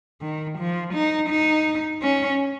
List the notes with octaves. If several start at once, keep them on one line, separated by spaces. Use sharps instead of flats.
D#3
F3
D#4
D#4
C#4